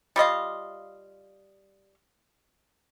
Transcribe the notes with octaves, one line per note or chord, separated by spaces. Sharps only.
G3 F4 D#5 F5